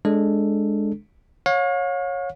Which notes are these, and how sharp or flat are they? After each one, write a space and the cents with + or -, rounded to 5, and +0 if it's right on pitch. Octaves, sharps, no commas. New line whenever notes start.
G#3 +10 D4 +0 A4 +0
C#5 -10 F5 +40